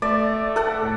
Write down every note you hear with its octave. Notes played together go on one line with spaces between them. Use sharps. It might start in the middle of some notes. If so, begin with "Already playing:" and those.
A3 D5
A4 F#5
A2